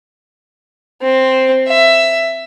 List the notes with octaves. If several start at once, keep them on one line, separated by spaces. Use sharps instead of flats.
C4
E5